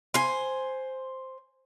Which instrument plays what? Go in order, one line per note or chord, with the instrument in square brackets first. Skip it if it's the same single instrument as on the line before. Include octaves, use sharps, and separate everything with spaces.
[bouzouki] C5 G#5